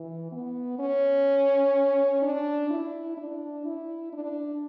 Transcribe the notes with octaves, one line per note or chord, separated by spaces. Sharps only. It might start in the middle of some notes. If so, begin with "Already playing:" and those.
Already playing: E3
B3
C#4
D4
E4
D4
E4
D4